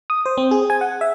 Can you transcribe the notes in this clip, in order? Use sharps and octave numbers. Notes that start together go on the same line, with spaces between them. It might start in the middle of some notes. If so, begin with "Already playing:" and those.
D#6
C5
C4
G#4
G#5
F#5
E5